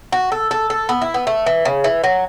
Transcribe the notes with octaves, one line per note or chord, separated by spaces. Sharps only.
F#4
A4
A4
A4
B3
E4
B3
A3
E3
C#3
E3
F#3